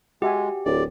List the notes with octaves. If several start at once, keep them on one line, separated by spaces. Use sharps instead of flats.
G#3 F#4 G4 E5 G#5
D1 D5